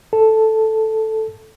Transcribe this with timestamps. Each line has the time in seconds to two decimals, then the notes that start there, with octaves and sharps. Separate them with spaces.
0.13 A4